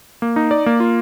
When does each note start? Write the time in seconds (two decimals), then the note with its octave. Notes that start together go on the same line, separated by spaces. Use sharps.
0.22 A#3
0.36 D#4
0.51 D5
0.66 A#3
0.80 F4